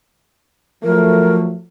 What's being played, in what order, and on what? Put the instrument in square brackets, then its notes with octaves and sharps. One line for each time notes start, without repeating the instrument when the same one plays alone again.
[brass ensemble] F3 F#3 A3 [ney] A#4